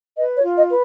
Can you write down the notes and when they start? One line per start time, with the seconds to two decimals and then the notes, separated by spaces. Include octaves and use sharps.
0.17 B4 D#5
0.36 C#5
0.43 F4
0.56 D#5
0.69 B4